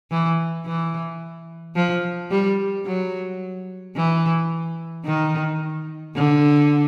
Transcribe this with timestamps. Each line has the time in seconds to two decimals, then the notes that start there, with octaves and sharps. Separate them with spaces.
0.11 E3
0.66 E3
1.76 F3
2.31 G3
2.86 F#3
3.96 E3
5.05 D#3
6.16 D3